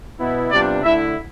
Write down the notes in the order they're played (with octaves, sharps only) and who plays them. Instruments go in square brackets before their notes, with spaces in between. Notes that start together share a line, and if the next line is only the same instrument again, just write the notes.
[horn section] B2 B3 E4
[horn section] C3 G3 B3 D4 F4 [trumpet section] D5
[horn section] D3 A3 E4 [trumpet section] E5